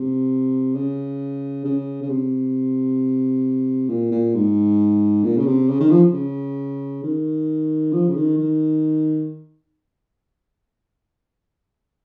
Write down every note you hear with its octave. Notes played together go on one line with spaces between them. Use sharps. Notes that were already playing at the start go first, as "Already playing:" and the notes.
Already playing: C3
C#3
C#3
C#3
C3
A#2
A#2
G#2
A#2
C#3
C3
C#3
D#3
F3
C#3
D#3
F3
C#3
D#3
D#3